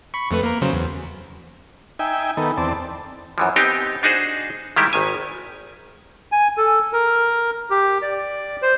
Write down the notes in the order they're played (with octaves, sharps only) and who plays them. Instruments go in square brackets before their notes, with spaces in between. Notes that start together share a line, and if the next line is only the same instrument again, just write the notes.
[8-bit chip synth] B5 C#6
F2 A3 B4
A#3 A#4
C#3 F#3 C5
E2
[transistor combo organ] D#4 E5 G5 G#5
D#3 B3 D#4 A4
E2 C4 D5 A5
[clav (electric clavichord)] F#2 E3 F3
B3 C4 D#4 G4
D4 D#4 F#4 G#4 C5
D#3 G3 G#3 E4 G4
G#1 D#3 G#5
[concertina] G#5
A4
A#4
G4
D5
C5